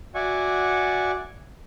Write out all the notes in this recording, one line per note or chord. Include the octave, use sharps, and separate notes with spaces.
F#4 D5 E5 F#5 G#5 C#6